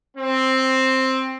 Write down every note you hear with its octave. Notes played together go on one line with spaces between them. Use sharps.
C4